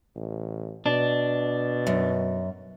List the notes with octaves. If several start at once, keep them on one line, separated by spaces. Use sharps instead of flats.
A1
B2 D4
F#2